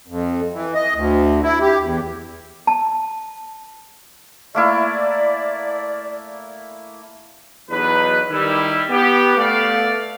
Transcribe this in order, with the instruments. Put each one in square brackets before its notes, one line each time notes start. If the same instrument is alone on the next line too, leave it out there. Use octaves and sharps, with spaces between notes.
[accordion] F2
E3
D#5
D2
E4
G4
E2
[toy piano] A5
[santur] A3 A#3 E4 [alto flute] D5
[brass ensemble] B1 E2 F#3 D#4 B4
D#3 G3 E4
B3 G4
A3 B3 D5 F5